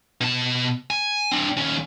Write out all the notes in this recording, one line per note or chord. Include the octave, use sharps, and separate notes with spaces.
B2 A5
G#5
C4 D4
D#2 C#4